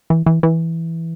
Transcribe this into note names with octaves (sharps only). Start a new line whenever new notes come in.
E3
E3
E3